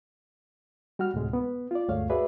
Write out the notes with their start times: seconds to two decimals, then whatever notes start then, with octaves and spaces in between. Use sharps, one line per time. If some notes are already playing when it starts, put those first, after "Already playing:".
0.99 G3 F#4 F#5 F6
1.14 D2 A2 C3 G#3
1.33 B3
1.71 F4 D5
1.88 D2 G2 G#3 A3 C#5 F5
2.09 F#4 G#4 B4 D5 E5